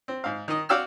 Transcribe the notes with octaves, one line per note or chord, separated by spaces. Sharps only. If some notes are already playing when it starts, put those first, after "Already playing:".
C4
G#2 F5
D#3 D#5
F#4 D5 F5 G5 E6 F6